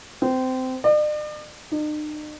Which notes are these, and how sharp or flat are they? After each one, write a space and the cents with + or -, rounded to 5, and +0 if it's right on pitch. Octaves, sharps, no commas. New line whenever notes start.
C4 -20
D5 +45
D#4 -45